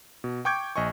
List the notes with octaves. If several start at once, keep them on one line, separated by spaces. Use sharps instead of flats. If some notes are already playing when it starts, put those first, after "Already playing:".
B2
G5 C#6 D6 G6 G#6 D7
A#1 D#5 G#5 C#6